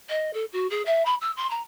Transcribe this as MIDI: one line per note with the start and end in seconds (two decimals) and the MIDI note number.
0.09 0.31 75
0.33 0.45 69
0.52 0.67 66
0.70 0.82 68
0.85 1.05 76
1.05 1.15 83
1.21 1.31 88
1.36 1.49 84
1.50 1.61 82